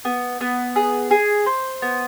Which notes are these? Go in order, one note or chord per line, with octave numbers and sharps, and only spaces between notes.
B3
B3
G#4
G#4
C5
B3